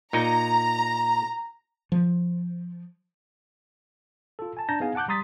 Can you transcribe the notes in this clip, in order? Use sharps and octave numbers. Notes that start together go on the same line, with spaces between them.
A#2 D#4 A#5
F3
F4 A4
G#5 A5
D4 A5 A#5 G6 A#6
B3 D#4 G#4 F5 G#5
F#5 A5 D6 F#6 G6
G3 A#5 C6 D#6 A6 B6